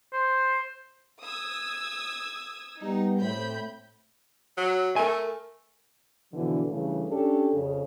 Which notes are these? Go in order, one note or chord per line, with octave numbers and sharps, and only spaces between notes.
C5
D#6 E6 G#6
G3 B3 D#4
A2 C4 B5 G6
F#3
A3 A#4 G#5
B2 D3 E3 F3
G2 C#3 E3 A3
C#4 D4 G4 A4
F2 C#3